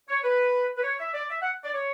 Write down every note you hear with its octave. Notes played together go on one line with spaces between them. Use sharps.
C#5
B4
B4
C#5
E5
D5
E5
F#5
D5
C#5